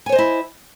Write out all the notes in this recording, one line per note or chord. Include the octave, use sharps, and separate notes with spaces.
E4 C5 C#5 D#5 G#5